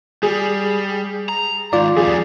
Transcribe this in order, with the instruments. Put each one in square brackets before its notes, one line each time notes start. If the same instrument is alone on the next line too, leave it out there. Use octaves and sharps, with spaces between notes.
[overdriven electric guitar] G3 [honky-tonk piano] G#4
[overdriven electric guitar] A#5
[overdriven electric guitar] G#2 D#3 [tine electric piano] F4 D5
[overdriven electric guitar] F2 G3 [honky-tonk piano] G#4